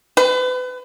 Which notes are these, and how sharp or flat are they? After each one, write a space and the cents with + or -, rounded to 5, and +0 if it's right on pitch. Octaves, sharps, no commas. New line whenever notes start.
B4 +35